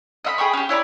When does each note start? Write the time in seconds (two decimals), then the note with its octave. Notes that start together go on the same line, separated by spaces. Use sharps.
0.25 D#5 E5 B5
0.38 G#4 G5 B5 C#6
0.53 C#4 G4
0.69 E4 C#5 D5 B5